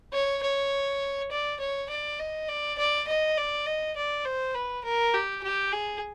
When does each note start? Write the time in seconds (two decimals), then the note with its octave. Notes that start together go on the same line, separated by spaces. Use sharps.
0.13 C#5
0.43 C#5
1.31 D5
1.60 C#5
1.90 D5
2.19 D#5
2.49 D5
2.78 D5
3.08 D#5
3.37 D5
3.66 D#5
3.96 D5
4.25 C5
4.54 B4
4.84 A#4
5.14 G4
5.43 G4
5.72 G#4